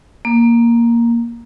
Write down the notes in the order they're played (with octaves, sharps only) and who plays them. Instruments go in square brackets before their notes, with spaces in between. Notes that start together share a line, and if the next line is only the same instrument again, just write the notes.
[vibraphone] A#3